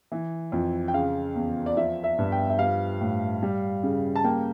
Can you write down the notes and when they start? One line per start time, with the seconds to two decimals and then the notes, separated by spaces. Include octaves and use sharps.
0.12 E3
0.52 F2
0.88 G5
0.94 C#3 F5
1.35 E2
1.66 D5
1.77 F3 E5
2.04 E5
2.18 G2
2.32 G5
2.49 E5
2.59 G3 F5
3.01 A2
3.43 G3
3.83 C#3
4.15 A5
4.24 A#3 G5